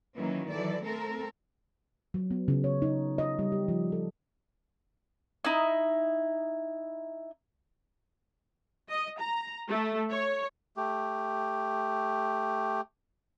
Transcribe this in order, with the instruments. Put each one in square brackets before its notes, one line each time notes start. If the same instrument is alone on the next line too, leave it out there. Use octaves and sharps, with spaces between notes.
[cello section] D#3 E3 F#3 A#3 C#4
E3 F#3 A4 D5
A3 C4 A4 A#4
[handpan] F#3
B3
C#3
C#5
D#4
D#5
G3
G4
F3
A4
[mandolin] D#4 E4
[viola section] D#5
A#5
A3
C#5
[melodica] A3 G4